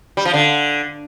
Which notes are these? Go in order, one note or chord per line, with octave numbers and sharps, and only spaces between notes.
G3
F3
D3